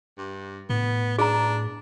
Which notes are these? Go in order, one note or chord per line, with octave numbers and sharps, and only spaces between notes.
G2
A2 B3
D4 G#4 A#5